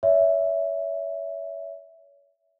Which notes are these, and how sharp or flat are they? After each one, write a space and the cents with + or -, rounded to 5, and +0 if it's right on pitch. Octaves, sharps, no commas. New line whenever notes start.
C#5 +35 E5 +0